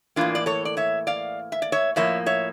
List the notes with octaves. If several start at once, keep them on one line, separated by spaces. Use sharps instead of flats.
A2 E3 A#3 D4 F4
D5
A4 C#5
D5
C#5 E5
D5 F5
E5
D5
C#5 E5
A2 F3 A#3 C#5 E5
C#5 E5